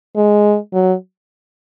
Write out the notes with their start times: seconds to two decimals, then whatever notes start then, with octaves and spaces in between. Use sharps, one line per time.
0.16 G#3
0.73 F#3